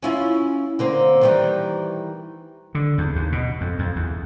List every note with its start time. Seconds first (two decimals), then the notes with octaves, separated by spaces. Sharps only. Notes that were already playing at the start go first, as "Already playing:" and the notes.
0.03 C#4 E4 F4
0.79 D3 A#3 C4
1.21 D#3 E3 G3
2.75 D3
2.98 E2
3.15 D#2
3.32 B2
3.61 F2
3.79 F2
3.96 E2